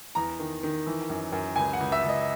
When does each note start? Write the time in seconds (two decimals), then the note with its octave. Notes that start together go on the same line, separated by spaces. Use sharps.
0.15 E2 A#5
0.39 D#3
0.63 D#3
0.87 E3
1.10 F#2
1.32 F#2
1.56 C#2 G#5
1.73 F#5
1.80 C#2
1.92 E5
2.03 C#2
2.09 D#5